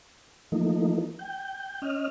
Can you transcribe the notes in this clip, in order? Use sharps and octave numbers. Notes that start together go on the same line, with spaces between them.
E3 F3 A3 A#3 D#4
G5
C#4 D#5 F6